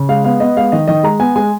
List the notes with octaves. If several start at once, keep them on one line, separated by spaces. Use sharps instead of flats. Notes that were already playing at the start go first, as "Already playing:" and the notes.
Already playing: C#3
G#3 F5
B3 F5
B3 D#5
G#3 F5
D#3 D#5
D#3 D#5
G#3 A#5
B3 G#5
G#3 G#5